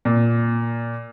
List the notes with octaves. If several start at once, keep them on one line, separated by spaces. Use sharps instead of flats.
A#2